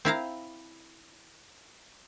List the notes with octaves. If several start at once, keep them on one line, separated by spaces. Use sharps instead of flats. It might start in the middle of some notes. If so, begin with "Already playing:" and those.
C4 E4 F5 A#5